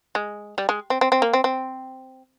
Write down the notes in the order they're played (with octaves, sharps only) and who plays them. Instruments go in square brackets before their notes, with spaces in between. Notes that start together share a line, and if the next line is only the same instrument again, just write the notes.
[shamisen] G#3
G3
G#3
C4
C4
C4
A#3
C4
C4